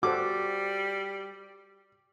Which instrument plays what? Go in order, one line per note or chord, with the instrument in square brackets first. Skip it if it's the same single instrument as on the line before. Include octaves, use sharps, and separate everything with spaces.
[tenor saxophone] G3 [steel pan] F#4 A4 C5 [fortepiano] D6